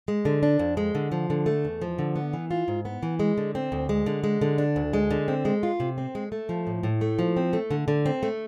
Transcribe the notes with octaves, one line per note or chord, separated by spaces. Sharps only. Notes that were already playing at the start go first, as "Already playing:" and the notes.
G#3
D3
D4
F2
G#3
D3
F3
D3
A3
E2
F3
D3
B3
E3
F4
G#2
B3
E3
G#3
D3
C4
D2
G#3
D3
G#3
D3
D4
D2
G#3
D3
C4
G#3
F4
C3
C4
G#3
A3
F3
A2
A2
A3
F3
C4
A3
D3
D3
C4
A3